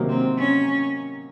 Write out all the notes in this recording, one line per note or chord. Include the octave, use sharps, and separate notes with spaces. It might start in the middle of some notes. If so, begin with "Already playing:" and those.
Already playing: C3 D#3 F#3 A#3 D#4
C4
C#4